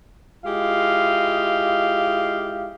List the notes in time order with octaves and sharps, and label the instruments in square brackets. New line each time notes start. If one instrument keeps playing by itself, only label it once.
[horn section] G#3 E4 F4 G4 D#5 F5